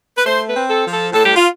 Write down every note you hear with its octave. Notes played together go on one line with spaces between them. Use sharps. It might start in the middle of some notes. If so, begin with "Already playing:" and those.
B4
A3 C5
B4
C4
A4
F3
A4
A2 A4
G4
F4